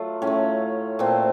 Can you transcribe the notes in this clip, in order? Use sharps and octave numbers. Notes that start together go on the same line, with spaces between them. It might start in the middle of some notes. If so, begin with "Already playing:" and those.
Already playing: F#3 A3 F4
A2 C#4
A3
A#2 A3 C4